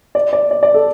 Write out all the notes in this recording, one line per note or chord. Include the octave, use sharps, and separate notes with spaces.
D5
D5
D5
D5
A4